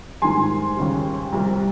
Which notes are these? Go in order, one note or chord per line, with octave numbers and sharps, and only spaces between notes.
G#2 D#3 G3 G#5 C6
D#2 C#3 G3
C2 C3 G3